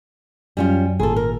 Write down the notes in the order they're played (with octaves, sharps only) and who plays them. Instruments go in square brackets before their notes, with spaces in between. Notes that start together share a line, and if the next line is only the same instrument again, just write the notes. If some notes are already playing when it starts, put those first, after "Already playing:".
[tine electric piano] F#2 F#3 [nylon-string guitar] G3 C#4 F4
[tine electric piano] G#1 A#2 [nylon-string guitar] G#4 A4
[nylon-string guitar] A#4